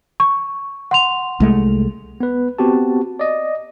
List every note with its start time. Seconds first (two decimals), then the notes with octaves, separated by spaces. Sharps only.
0.20 C#6
0.91 F#5 C6 F7
1.40 C2 G#3 A3
2.20 B3 B4
2.59 B3 C4 F#4 G4 A5
3.19 D5 D#5